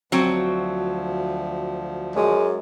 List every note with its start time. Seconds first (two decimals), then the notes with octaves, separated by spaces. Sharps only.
0.12 D2 F3 F#3 C4
2.16 F#2 G#3